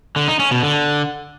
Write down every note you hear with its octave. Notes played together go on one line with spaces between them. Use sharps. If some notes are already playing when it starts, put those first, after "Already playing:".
D3
D#4
C#4
B2
D3